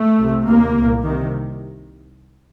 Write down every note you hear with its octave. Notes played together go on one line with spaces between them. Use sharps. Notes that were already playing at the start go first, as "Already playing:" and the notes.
Already playing: A3
C2 C3
D#2 A#3
C2 A#2
C2 C3 D#3